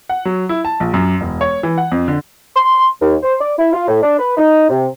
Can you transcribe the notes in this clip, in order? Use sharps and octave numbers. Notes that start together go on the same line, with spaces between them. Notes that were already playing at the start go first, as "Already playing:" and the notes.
F#5
F#3
E4
A5
A#1
F#2
E1
C#5
E3
F#5
F2
D3
C6
D#2
C5
D5
E4
F4
A2
D4
B4
D#4
C3